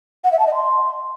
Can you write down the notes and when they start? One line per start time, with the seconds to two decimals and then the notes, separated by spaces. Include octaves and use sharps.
0.24 F#5
0.32 E5
0.39 A5
0.47 D#5
0.54 C6